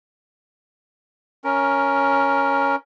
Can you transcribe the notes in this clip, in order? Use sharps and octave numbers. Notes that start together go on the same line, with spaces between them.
C#4 A#4